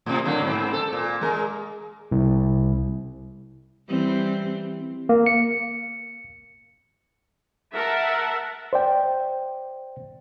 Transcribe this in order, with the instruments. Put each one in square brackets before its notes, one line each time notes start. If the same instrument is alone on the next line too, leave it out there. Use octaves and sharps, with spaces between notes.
[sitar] A2 C3
D3 F#3 A#3
G#2 C4
A4
A#2
G#3 A#4
[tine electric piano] C2
[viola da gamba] E3 G3 C4
[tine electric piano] A#3
C#7
[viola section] A#4 E5 F#5 A5
[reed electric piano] C5 D5 G5